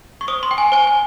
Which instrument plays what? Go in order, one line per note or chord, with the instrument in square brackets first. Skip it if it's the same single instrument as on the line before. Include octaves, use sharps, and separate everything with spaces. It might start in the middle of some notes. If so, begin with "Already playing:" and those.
[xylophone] C#6
C5 D#6
C6
G5
G#5
C5 G#5
G#5